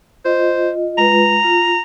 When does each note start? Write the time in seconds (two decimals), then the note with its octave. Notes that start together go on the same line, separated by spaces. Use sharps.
0.25 F4 C5 D#5
0.98 G#3 F4 B4 A#5
1.44 F4